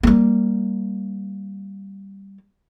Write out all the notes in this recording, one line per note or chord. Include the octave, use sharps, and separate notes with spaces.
G3 A#3